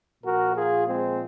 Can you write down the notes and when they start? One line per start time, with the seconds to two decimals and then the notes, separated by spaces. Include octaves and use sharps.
0.23 A#2 F3 F#4 A#4
0.55 F4 G#4
0.87 G#3 C4